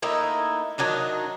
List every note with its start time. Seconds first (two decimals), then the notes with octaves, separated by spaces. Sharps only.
0.02 A3 A#3 D#4 E4
0.78 D#3 F#3 D4 D#4